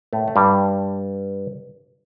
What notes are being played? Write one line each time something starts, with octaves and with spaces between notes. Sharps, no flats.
A2 A3
A3
G2 G3